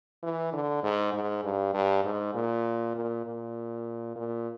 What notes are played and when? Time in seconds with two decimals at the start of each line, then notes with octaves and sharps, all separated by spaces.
0.23 E3
0.53 D3
0.83 G#2
1.13 G#2
1.44 G2
1.74 G2
2.04 G#2
2.34 A#2
2.95 A#2
3.25 A#2
4.16 A#2